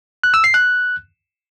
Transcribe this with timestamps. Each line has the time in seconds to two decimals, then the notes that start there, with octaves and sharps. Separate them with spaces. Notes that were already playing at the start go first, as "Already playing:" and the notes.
0.24 F#6
0.34 E6
0.44 C7
0.54 F#6